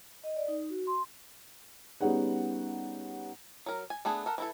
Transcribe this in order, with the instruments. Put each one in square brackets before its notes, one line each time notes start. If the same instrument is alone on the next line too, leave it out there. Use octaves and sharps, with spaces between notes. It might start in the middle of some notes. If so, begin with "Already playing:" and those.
[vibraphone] D#5
D5
D#4
F#4
C6
[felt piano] G3 B3 C#4 D#4 G#4 F#5
[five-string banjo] F#3 A#4
G#5
A3 B3 D4 G#4
A4 A#4 F#5
E3 E4 A4